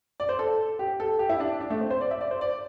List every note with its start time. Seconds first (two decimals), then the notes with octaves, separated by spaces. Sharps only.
0.20 D5
0.29 C5
0.39 A4
0.79 G4
1.00 A4
1.19 G4
1.29 E4
1.40 D4
1.60 D4
1.70 A3
1.81 C4
1.90 C5
2.01 D5
2.11 E5
2.21 D5
2.31 C5
2.41 D5